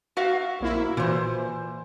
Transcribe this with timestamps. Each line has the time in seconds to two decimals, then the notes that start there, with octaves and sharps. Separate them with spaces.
0.17 F#4 E5 F5
0.60 A#1 A#3 E4
0.97 A#2 E3 C5